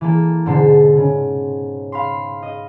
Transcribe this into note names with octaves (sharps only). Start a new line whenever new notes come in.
E3 A#3 A4
G#2 B2 D3 A4 C7
C#3
F5 B5 C6
D#5